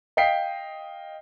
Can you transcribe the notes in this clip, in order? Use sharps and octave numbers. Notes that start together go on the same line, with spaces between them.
D#5 F5 G5 B6 C7 D7